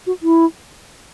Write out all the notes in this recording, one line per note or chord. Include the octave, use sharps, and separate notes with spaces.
F#4
E4